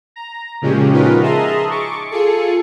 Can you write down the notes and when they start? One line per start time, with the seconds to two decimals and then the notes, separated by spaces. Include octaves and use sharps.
0.16 A#5
0.62 A#2 C#3 F3 G#3 C#4 G4
0.93 D#4 F4 F#4 A#4 B4
1.22 G#4 D#5 E5 A5 A#5 C6
1.69 C#6 D6
2.10 F4 G#4 A4 C#7